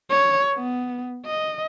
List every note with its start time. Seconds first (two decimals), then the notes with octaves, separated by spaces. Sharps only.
0.10 C#5
0.54 B3
1.26 D#5